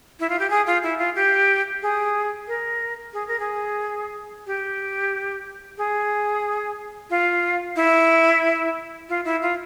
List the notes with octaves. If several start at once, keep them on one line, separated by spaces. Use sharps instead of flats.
E4
F4
G4
G#4
F4
E4
F4
G4
G#4
A#4
G#4
A#4
G#4
G4
G#4
F4
E4
F4
E4
F4